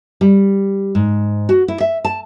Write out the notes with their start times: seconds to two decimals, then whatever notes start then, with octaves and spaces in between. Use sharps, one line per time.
0.21 G3
0.95 G#2
1.49 F#4
1.68 E4
1.80 E5
2.05 A5